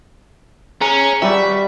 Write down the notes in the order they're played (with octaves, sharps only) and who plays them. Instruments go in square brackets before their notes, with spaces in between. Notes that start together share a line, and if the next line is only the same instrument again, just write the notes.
[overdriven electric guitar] C#4 [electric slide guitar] G#4 A#5
[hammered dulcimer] G3 [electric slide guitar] F#4 D5 [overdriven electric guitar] E5